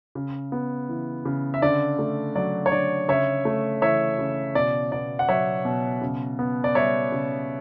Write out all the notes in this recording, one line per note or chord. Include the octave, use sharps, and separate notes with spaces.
C#3
B3
E3
C#3
E5
D3 D5
A3
F#3 D5
C#5
D3 D5
C#3 C#5 E5
A3
E3 C#5 E5
C#3
B2 D5
B3 D5
F#5
F#3 C#5 E5
B2
C#3
B3
D5
G3 C#5 E5
C#3